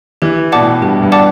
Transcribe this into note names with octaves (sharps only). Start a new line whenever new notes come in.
E3 G4
B2 D5 F#5 A5 D6
A2
G2 G4
G2
D5 F#5 A5 D6